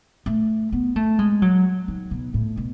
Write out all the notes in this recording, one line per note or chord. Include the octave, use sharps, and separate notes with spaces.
A3
B3
A3
G#3
F#3
D#3
B2
A2
B2